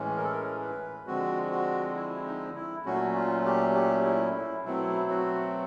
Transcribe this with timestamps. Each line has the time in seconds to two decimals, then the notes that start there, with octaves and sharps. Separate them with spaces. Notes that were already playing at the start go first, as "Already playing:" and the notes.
Already playing: A2 E3 G#3 C#4
0.17 A#4
0.24 A4
0.32 A#4
0.62 B4
1.07 D3 F3 G#3 C4 F#4
1.51 F#4
1.95 E4
2.25 D#4
2.55 E4
2.86 A#2 F#3 A3 C#4 F#4
3.15 F4
3.45 G4
3.75 G4
4.05 E4
4.36 E4
4.65 B2 F#3 A3 C4 E4
5.10 F#4